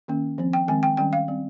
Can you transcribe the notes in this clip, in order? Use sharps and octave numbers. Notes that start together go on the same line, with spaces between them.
D#3 A#3 C#4
F3 C4
G5
D#3 G#3 C4 G#5
G5
D#3 G3 C#4 G5
F5
G3 C4